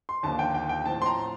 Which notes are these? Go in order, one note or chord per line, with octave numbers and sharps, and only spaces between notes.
C6
D#2 D3 F3 A#3 D4 A5
G5
G5
G5
A2 F3 C4 A5
C6
A#5